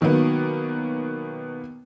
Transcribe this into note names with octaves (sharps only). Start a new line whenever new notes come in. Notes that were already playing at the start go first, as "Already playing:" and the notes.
B2 D#3 F#3 A#3 B3